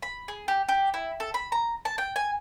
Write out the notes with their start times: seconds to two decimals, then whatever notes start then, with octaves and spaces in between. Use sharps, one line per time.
0.02 B5
0.28 G#4
0.48 G4
0.69 G4
0.94 E4
1.20 A4
1.34 B5
1.52 A#5
1.85 A5
1.98 G5
2.16 G#5